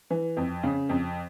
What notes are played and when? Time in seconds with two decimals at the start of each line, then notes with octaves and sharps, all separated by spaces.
0.10 E3
0.37 F2
0.63 C#3
0.89 F2